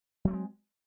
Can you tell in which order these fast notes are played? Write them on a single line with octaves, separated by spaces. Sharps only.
F#3 A3 C4 G#3